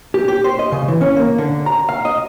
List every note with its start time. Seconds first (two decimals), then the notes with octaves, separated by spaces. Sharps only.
0.14 G4
0.28 G4
0.44 C5
0.59 D#5
0.72 C#3
0.88 E3
1.01 C#4
1.17 A#3
1.38 D3
1.66 A#5
1.89 F5
2.05 D#5